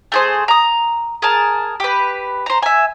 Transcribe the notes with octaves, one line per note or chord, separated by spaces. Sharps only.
A3 G#4 C5
A#5 D#6
G#4 A#4 A5
G4 B4
C5 A#5
E5 G#5